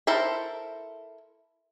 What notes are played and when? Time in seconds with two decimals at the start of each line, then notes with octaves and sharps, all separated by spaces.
0.07 E4 A4 A#4 C5 E5